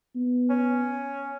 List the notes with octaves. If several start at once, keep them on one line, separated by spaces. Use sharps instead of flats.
B3
C#4